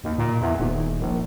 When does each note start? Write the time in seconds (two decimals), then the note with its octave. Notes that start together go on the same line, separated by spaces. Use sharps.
0.04 D#2
0.18 A#2
0.41 E2
0.59 D#1
1.00 A#1